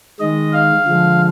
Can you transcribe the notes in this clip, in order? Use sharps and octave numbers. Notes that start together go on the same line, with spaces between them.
D#3 G#3 D#5
F5
D3 F3 G#3